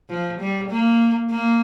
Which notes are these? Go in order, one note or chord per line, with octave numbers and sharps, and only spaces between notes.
F3
G3
A#3
A#3